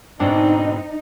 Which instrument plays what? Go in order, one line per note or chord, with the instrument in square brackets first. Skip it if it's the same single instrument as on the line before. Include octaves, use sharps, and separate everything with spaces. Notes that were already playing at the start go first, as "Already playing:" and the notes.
[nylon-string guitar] G#2 B2 D3 [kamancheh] C4 [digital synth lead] D4 [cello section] D#4